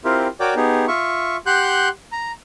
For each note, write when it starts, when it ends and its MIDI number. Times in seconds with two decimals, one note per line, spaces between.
0.04 0.27 60
0.04 0.27 64
0.04 0.27 65
0.04 0.27 67
0.04 0.27 70
0.40 0.54 66
0.40 0.54 70
0.40 0.54 73
0.40 0.54 74
0.40 0.54 79
0.40 0.54 86
0.56 0.86 59
0.56 0.86 63
0.56 0.86 67
0.56 0.86 68
0.88 1.37 65
0.88 1.37 76
0.88 1.37 85
1.46 1.88 67
1.46 1.88 78
1.46 1.88 84
1.46 1.88 90
1.46 1.88 91
2.12 2.32 82